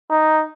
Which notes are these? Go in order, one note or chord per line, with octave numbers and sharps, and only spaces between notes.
D#4